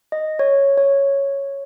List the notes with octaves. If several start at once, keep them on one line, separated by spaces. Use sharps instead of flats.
D#5
C#5
C#5